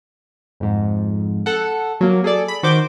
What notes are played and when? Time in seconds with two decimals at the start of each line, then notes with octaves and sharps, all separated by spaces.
0.60 F2 G#2
1.46 A4 F#5
2.01 F#3 A#3
2.24 G#4 A4 D5
2.48 B5
2.63 D#3 F#4 C5 D6 G6